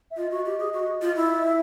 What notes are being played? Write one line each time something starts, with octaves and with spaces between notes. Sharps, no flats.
E5
F4 D#5
F#4
G4
G#4
F#4
F4
E4
E5